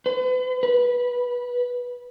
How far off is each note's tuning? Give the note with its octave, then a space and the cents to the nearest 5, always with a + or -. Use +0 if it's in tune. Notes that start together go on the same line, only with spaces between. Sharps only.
B4 +45
B4 -15